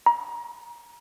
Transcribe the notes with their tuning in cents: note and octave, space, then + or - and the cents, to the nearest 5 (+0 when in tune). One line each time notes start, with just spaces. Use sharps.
A#5 +30